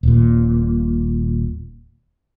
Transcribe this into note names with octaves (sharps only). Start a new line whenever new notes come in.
D#1 A#2